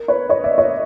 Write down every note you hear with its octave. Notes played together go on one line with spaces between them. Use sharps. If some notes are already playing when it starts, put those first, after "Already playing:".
Already playing: A#4
B4 C#5
C#5 D#5
D5 E5
C#5 D#5